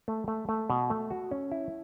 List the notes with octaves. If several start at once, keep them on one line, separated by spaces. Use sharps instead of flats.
A3
A3
A3
B2
A3
F#4
C#4
E4